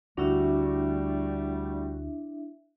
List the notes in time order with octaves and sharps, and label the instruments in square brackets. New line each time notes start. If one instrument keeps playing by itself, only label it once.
[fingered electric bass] D2 D3 [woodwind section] G3 A3 [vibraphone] D4 E4 E5 [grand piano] F#4